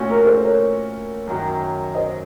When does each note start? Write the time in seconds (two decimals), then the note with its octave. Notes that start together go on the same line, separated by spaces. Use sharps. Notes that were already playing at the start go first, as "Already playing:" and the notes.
Already playing: A#2 A3 C#4 F#4
0.10 A#4
0.26 A4 C5
0.43 A#4 C#5
1.27 F#2 D#3 F#3
1.95 C5 D#5